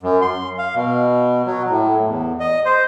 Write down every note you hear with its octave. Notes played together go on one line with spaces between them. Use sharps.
F#2
C6
F5
B2
F#3
A2
E2
D#5
C5